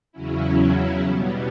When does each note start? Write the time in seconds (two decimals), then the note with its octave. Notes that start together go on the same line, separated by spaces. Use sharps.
0.12 E2 C#3 F#3 C#4 E4
1.01 B2 G3 B3